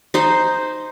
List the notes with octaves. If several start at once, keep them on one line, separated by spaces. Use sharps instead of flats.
D#4 C5 D#5